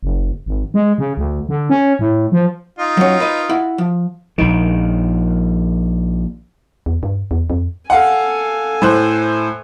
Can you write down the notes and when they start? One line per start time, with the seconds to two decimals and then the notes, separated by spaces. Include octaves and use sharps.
0.03 F#1
0.46 G#1
0.74 G#3
0.98 C#3
1.17 D2
1.49 D3
1.70 C#4
1.99 A2
2.32 F3
2.79 D#4 F4
2.97 F#3 C#4
3.20 B4 D#5
3.49 E4 F#4
3.78 F3
4.38 A#1 D#3
6.86 E2
7.03 G2
7.31 E2
7.50 F2
7.90 A4 F5 F#5 G#5
8.82 A2 C5 F#6